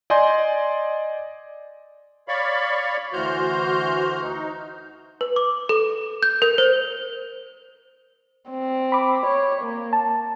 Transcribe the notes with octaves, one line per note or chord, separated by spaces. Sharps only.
D5 D#5 G#5 C6 G6
C#5 D5 F5 B5 C#6
D2 E3 F#4 C5 F6 G6
D#4
B4
D6
A4
G6
A#4
C5
C4
B5 D6
C#5
A#3
A5